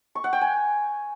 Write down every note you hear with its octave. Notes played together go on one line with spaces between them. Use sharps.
C#6
F#5
G5
G#5